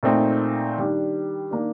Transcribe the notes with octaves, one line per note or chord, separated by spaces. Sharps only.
A#2 A3 C4 D#4
D#3 G3 D4
D#3 A#3 D4